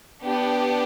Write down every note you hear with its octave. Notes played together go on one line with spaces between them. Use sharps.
B3 D4 G4